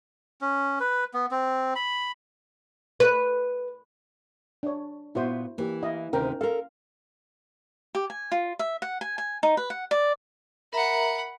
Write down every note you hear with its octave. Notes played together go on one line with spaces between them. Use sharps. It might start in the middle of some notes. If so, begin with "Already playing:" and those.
C#4
B4
B3
C4
B5
B4
D4 C#5
A#2 B3 E4 F#4 C5
E3 A#3 G4
E4 D#5 F5
D2 C3 D#3 C#4 A#4 G5
A4 A#4 F5
G4
G#5
F4
E5
F#5
G#5
G#5
D#4
B4
F#5
D5
A#4 E5 F#5 A#5 B5